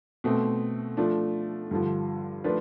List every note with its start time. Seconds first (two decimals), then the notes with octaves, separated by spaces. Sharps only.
0.24 B2 A3 C4
0.97 F3 A3 D4
1.71 G2 D3 F3
2.44 F3 A3 D4 F4 B4